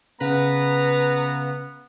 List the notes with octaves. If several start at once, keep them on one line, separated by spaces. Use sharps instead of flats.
C#3 B3 B4 A#5